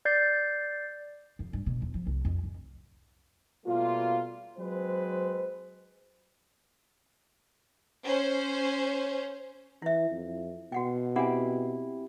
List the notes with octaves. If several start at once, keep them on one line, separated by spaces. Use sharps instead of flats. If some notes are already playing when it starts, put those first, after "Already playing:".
D5 G6 A6 C7
F2
G2
B2
E2
F3
C2
F2
G#2
B2 G3 A3 A#3 F4
F#3 G#3 C4 B4 C5
C#4 C5
E3 E4 E5
F2
B2 F#4 F#5 G5
C4 E4 G4 F#5 G#5